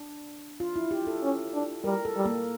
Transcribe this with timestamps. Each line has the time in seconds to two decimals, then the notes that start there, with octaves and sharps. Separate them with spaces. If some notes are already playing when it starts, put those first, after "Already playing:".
Already playing: D4
0.60 F4
0.76 E4
0.91 G4
1.07 A4
1.22 C#4
1.53 D4
1.84 G3 A#4
2.05 A4
2.16 G3
2.26 A#3